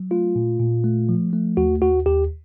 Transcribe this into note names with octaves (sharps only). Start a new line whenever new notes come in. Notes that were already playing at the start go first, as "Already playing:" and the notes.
Already playing: F#3
A3 F4
A#2
A#2
A3
F3
A3
D#2 F#4
D#2 F#4
D#2 G4